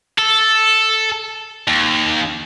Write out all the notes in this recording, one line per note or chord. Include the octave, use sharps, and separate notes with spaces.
A4
D#2